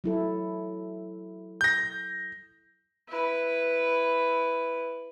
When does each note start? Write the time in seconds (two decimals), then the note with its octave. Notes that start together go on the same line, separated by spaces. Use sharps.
0.04 F#3 E4 A4
1.61 G6 A#6
3.08 E4 B4